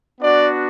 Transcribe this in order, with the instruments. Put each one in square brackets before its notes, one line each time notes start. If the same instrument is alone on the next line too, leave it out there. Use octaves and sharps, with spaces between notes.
[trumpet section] B3 D4 F#4 D5